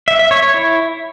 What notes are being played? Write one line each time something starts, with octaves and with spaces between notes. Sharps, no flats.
E5
E5
C#5
C#5
E4